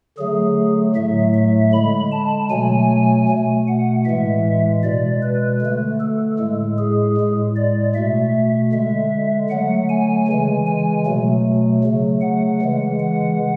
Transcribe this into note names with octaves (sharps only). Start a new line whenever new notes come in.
D3 F#3 A3 G#4
A2 F#3 A3 E5
E5
D3 G#3 B5
A5
B2 F#3 A3 G#5
B2 A3
F#5
A2 E3 G#3 E5
B2 G#3 D5
B4
D3 A3
A4
A2 G#3
G#4
A2 G#3
D5
B2 A3 E5
D3 G#3 E5
D3 F#3 A3 F#5
G#5
C#3 E3 G#3
G#5
B2 F#3 A3
C#3 F#3 A3
F#5
C#3 E3 G#3
F#5